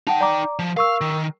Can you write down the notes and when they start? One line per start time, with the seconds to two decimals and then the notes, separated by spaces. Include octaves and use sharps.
0.07 D#4 F#5 G5 A5
0.21 D5 A#5 D6
0.59 F3
0.77 A#4 F5 C#6 E6
1.01 D#3